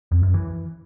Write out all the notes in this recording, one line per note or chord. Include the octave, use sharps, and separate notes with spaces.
F2
F#2
E3